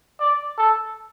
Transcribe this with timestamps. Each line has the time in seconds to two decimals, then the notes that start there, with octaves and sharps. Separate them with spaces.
0.20 D5
0.58 A4